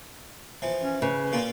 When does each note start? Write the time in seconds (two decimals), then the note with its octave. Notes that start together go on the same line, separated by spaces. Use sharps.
0.62 E3 F3
0.82 C#4
1.02 C#3 B4
1.32 A#2 A#3 F4